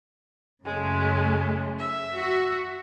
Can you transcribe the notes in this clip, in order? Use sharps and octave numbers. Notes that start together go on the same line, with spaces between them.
F#2 C#3 G#3 A3
E5
F#4